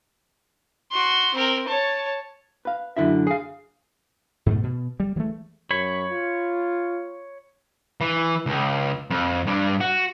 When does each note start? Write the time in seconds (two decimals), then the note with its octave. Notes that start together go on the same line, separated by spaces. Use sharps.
0.92 F#4 C6
1.34 C4 A#4
1.68 C#5 A5
2.65 B4 F5
2.97 F#2 D3 E4 E5
3.27 G#4 F5
4.46 G#2 B2 A3
4.63 B2
5.00 G3
5.16 E3 F#3 G#3 A3
5.71 F#2 C#5 B5
6.11 F4
8.01 E3
8.46 C#2
9.10 F2
9.47 G2 D4
9.80 F#4